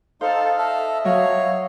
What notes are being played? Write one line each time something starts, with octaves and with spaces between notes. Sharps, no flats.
D#4 A4 C5 F5
A4 D#5 E5
F#3 C#5 F5